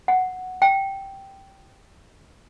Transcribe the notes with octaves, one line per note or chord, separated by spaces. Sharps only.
F#5
G5